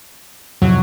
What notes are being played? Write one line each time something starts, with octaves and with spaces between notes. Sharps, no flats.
F2 A2 C3 F#3